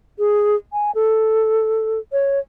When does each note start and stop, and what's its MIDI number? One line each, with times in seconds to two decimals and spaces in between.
0.19 0.55 68
0.73 0.91 80
0.95 1.99 69
2.12 2.39 73